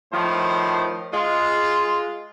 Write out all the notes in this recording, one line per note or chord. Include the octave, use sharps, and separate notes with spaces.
A2 D#3 F3 C5
G#3 F4